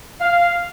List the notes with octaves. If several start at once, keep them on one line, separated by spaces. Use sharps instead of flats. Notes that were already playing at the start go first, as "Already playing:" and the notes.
F5